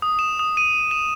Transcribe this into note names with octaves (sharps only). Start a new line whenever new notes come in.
D#6
E7
D#6
D#7
E7